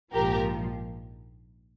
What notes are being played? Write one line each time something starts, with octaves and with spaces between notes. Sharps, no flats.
A#1 G#2 F3 G4 A#4